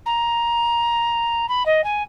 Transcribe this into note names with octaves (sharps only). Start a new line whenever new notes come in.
A#5
B5
D#5
G#5